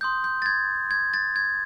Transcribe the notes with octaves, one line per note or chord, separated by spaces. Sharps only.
C6 D#6 G6
G6
A6
G#6
G#6
A6
G#6